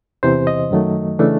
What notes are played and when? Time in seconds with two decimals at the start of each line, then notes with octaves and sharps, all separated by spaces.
0.23 E2 C3 E3 C5
0.47 D#5
0.71 F#2 D#3 F#3 A3
1.19 C#3 E3 A3 D4